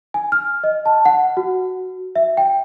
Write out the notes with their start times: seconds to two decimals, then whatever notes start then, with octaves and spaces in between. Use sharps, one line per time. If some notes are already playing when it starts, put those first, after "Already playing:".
0.14 G#5
0.32 F6
0.64 D#5
0.86 A5
1.05 F#5
1.37 F#4
2.16 E5
2.37 G5